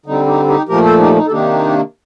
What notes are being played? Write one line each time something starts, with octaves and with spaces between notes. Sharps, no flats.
D3 G3 C4 D#4
D#4 G4
D#4 G4
A#2 F3 A3 G4 A#4
A4 C5
D#4 G4
D#4
A4
C3 D#3 A#3 D4 D#4 G4